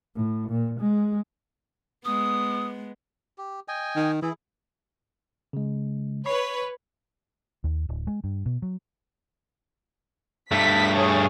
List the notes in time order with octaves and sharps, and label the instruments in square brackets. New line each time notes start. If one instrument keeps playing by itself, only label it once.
[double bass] A2
A#2
G#3
[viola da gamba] G#3 B3 [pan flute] D#6
[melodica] G4
D#5 G5 G#5
[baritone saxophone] D#3
[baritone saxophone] E3 [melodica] E4 G#4
[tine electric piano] C#3 G#3
[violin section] B4 C#5 [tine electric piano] B5 C#6 C7
[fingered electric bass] D#2
D1
G#3
G2
B2
F#3
[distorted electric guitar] G2 A3 [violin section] B6
[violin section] G#4 C#5